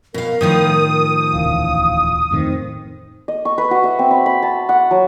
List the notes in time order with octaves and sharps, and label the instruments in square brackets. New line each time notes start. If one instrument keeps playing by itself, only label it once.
[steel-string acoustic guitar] B2 F5 [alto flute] A#4
[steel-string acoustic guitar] A2 D#3 F3 [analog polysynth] D#6
[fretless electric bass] D#1 C#2 E3 [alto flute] F5
[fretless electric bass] F2 A2 D#3 [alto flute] C4
[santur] D#5
C#6
B4
F#4
E5
C4
B5
B5
A5
F#5
F#3